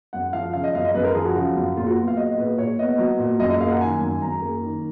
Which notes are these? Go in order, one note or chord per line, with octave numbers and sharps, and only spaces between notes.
F#2 F#5
F3 F5
C#3 F5
D#5
F#2 F5
D#5
F#2 B4
A#4
F3 G#4
F#4
C#3
F#2
A#2 F4
F#4
B3
F5
F#3 D#5
A#2 B4
A#2 C#5
B3 D#5
F#3
A#2
F#2 D#5
D#5
A#3 F5
F#5
D#3 G#5
F#2 G#5
F#2 A#5
A#3
D#3